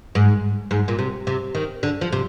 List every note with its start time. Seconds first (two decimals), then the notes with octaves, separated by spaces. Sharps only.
0.15 G#2
0.71 G#2
0.88 A#2
0.99 C3
1.27 C3
1.55 D#3
1.83 D3
2.01 F3
2.12 C3